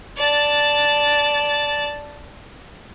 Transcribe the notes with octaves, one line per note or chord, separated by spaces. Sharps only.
D5 A5